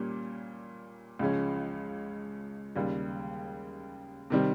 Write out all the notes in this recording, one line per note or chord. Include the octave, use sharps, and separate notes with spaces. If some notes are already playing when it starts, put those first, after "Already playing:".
Already playing: A#2 G3 A#3 C#4 G4
C#2 C#3 F3 G#3 C#4
D#2 C#3 G3
C3 D#3 G3 C4